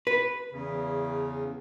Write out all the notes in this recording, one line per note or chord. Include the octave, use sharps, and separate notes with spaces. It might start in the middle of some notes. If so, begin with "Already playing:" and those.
B4
E2 C#3